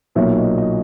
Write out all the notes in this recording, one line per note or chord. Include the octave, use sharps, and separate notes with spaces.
B1 A#2 F#3 A#3 E5
D#5
D#5